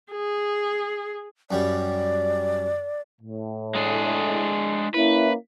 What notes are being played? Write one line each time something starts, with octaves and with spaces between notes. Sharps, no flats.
G#4
F#2 G3 D5
A2
G#3 D4 G#4
A#3 C#4 E4 B4